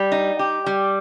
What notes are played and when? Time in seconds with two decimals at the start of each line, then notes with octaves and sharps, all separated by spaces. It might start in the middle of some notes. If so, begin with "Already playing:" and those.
Already playing: G3
0.12 D#4
0.39 G4
0.66 G3